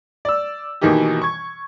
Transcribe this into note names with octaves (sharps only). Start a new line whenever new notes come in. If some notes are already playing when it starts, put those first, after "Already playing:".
D5 E6
B2 D#3 E3 A#3 D#4 G4
C#6 G#6